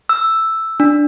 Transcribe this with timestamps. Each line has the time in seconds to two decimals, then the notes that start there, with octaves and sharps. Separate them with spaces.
0.09 E6
0.80 D4